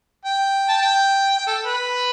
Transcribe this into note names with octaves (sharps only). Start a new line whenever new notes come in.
G5
A5
G5
G5
A4
B4